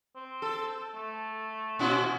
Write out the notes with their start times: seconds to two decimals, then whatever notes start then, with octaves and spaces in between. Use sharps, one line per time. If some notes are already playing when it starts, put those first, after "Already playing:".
0.16 C4
0.42 A4
0.95 A3
1.79 A#2 C#4 E4 F#4